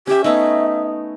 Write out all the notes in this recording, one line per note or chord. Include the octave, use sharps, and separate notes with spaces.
C#4 G4 E5
A3 B3 D#4 E5